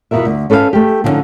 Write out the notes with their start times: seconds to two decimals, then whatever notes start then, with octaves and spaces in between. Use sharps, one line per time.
0.11 E2 B2 B3 F4 A#4 E5
0.25 D2
0.50 C#4 A4 B4 C#5 F5
0.73 A3 G4
1.04 D3 F3 G#3 C4 C#4 D#4